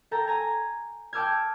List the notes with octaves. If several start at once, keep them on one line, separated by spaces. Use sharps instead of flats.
A4 G5 A#5 A6
G#5 A#5 G#6
G5 A5 D6 E6 F6 G#6